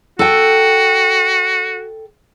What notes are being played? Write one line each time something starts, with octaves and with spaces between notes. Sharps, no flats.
F#4 A4 G5